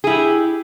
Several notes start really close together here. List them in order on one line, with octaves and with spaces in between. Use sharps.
G#4 E4 G4